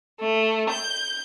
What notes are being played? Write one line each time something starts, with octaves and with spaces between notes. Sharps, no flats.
A3
G6